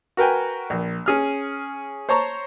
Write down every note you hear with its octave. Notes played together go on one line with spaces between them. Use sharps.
F#4 A#4 B4 G5 G#5
A#1
C#4 G#4 F6
C5 C#5 A5 A#5 C#6